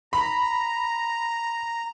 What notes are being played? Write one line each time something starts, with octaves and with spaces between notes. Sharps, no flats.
A#5 B5